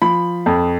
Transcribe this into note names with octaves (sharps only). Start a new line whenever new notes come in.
F3 B5
F2